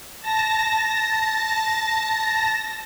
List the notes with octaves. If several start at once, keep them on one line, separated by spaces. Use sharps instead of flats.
A5 A#6